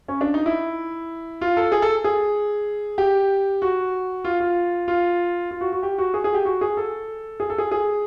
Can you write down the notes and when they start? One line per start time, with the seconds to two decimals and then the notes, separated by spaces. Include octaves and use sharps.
0.08 C#4
0.21 D4
0.34 D#4
0.46 E4
1.41 F4
1.57 A4
1.72 G#4
1.82 A4
2.04 G#4
2.98 G4
3.62 F#4
4.25 F4
4.40 F4
4.88 F4
5.51 F4
5.61 F#4
5.72 F#4
5.83 G4
5.98 F#4
6.14 G#4
6.24 G#4
6.34 G4
6.45 F#4
6.61 G#4
6.77 A4
7.40 G#4
7.50 A4
7.58 G#4
7.72 G#4